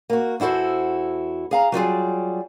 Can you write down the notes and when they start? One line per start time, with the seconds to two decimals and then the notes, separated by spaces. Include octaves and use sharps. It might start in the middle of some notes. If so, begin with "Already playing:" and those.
0.10 A#3 F#4
0.40 E2 E4 F#4 A4 C5
1.51 G#4 F5 A#5
1.72 F#3 G3 F4 G#4